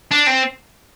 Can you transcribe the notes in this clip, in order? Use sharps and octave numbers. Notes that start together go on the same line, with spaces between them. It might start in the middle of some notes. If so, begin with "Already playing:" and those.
D4
C4